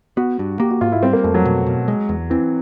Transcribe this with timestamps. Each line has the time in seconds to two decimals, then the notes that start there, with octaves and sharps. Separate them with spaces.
0.17 B3 F#4
0.39 G2
0.60 A#3 G4
0.71 F#4
0.81 G#2 F4
0.92 E4
1.03 G3 C4
1.13 A#3
1.24 F2 A3
1.34 F#3
1.45 B2
1.67 B2
1.88 G#3
2.09 E2
2.30 E3 C4